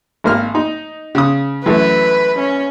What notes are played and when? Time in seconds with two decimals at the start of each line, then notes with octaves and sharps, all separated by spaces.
0.24 G#1 A#3 F6
0.55 D#4
1.15 C#3 D#6
1.66 F#2 E3 A3 B4
2.39 C#4